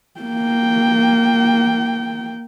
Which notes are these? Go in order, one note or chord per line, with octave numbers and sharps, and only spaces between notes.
A#3 G5